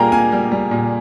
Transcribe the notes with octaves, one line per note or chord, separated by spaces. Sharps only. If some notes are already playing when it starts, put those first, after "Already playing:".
Already playing: A#2 G3 A#3 F4 G#4 G5 G#5 A#5
A#3 G#5
G3
G3
A#2